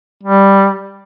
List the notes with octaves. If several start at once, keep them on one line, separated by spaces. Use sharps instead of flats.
G3